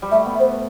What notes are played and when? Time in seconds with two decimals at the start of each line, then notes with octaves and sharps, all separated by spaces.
0.02 G3
0.11 A3 E5
0.26 B3
0.40 C5